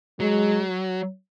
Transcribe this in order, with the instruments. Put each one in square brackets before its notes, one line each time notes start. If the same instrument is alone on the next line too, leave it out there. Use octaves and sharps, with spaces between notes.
[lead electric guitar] F#3 [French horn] G#3